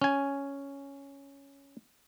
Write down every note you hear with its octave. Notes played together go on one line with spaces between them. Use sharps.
C#4 G#5